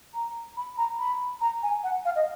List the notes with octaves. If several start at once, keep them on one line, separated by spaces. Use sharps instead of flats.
A#5
B5
A#5
B5
A#5
G#5
F#5
F5
D#5